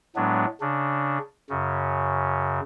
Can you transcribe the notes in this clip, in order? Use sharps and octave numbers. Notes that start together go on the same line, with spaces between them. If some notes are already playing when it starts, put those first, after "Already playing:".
A2 F#3 G#3 B3 D4
C#3 D4
F#2 C#3